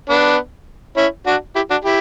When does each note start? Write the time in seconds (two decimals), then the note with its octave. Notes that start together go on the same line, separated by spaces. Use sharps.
0.09 B3 D4
0.97 C#4 E4
1.26 D4 F#4
1.55 E4 G4
1.70 D4 F#4
1.85 E4 G4